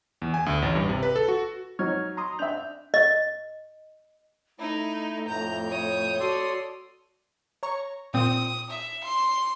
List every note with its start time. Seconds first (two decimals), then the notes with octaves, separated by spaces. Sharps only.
0.22 E2
0.34 G#5
0.46 D2
0.62 A1
0.75 G2
0.89 C3
1.03 B4
1.16 A4
1.28 F#4
1.79 F#3 D#4 C#5 C#6 F6 G#6
2.17 A#5 C6 D#6
2.39 D4 E5 G6 F7
2.94 D#5
4.59 A3 D#4 E4
5.28 F2 A2 A#5 G6
5.68 C#5 D#6
6.20 F#4 A4 D5 C6
7.63 C#5 A#5 C#6
8.14 A#2 C4 D#6
8.70 E5
9.04 C6